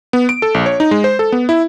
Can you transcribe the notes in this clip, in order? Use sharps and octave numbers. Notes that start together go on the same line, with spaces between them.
B3
D7
A4
A#1
C#5
D#4
G#3
C5
A4
B3
E4